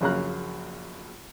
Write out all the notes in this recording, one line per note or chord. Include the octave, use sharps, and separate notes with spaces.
A#1 F#2 C#3 A#3 A#5 F#6